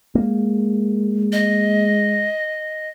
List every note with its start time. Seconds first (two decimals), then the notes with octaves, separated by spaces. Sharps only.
0.15 G#3 A#3
1.32 D#5